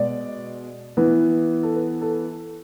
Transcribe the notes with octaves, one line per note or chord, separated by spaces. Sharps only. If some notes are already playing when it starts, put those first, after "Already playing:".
Already playing: B2 G#3 B3 D5
E3 B3
A4
B4
A4